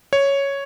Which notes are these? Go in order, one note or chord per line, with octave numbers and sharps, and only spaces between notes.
C#5